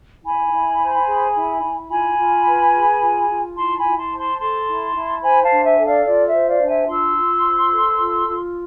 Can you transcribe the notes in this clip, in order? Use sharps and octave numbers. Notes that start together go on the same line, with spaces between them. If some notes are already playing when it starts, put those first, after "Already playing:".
E4 G#5 B5
E4
C5
G#4
E4
E4
F4 G#5 B5
F4
B4
G#4
F4
F4
E4 A5 C6
G#5 B5
E4
A5 C6
C5
A5 C6
A4 A5 C6
E4
E4
C5 G#5 B5
F5 A5
D4
E5 G#5
A4
D5 F5
F4 D5
E5
C5
D5 F5
D4
E5 G#5
F4 C6 E6
F4
C5
A4
F4
F4